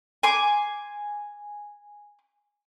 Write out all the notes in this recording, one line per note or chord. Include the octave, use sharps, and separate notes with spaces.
G#5 C6 D6